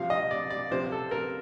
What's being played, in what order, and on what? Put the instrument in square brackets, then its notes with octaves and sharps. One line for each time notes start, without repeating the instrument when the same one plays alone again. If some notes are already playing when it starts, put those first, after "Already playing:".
Already playing: [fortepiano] C3 F3 F5
D#5
D5
D5
C3 F3 C5
A4
A#4